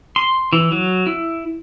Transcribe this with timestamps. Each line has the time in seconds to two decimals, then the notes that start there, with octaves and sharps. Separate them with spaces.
0.16 C6
0.53 E3
0.72 F#3
1.07 E4